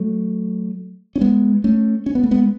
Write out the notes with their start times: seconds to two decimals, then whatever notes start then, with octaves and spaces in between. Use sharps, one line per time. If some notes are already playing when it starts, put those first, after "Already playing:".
Already playing: F#3 A3
1.16 C#4
1.21 G#3 B3
1.64 A3 C#4
2.06 C#4
2.15 B3
2.23 A3
2.31 G#3 B3